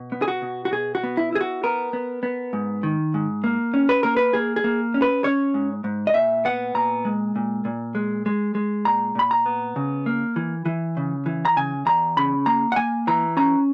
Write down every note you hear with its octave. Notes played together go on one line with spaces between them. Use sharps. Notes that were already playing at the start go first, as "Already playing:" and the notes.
Already playing: B2
B3
G#4
F#4
B2
F#4
B2 G#4
F#4
B3
E4
E4 G#4
F#4
B3 A#4
B3
B3
G#2
D#3
G#2
A#3
C#4
B4
A#3 A#4
B4
A#3 G#4
G#4
A#3
C#4
B4
C#4 C#5
G#2
G#2
D#5
A#2 E5
B3 F#5
A#2 A#5
G#3
A#2
A#2
G#3
G#3
G#3
A#2 A#5
A#2 B5
A#5
B3
C#3
A#3
E3
E3
C#3
E3
A#5
C#3 G#5
E2 A#5
C#3 B5
A#3 A#5
F#5
A#3 G#5
E3 A#5
C#4 A#5